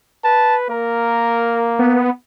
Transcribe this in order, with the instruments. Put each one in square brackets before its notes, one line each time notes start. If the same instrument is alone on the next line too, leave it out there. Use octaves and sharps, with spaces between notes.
[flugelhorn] B4 [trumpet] A5
[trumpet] A#3 [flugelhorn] A#4
[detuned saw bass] B3